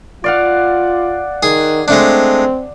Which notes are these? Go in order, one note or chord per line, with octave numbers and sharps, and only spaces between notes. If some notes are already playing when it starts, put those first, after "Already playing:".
F4 D5 F5 F#5
D#3 G#4
G#3 A3 C4 D4